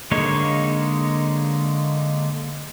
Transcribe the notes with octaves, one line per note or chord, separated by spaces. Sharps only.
D3 G#3 A#3 D#4 C#5